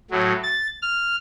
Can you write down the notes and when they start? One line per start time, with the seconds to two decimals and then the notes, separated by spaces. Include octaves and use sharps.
0.11 A2 F#3
0.43 A6
0.82 F6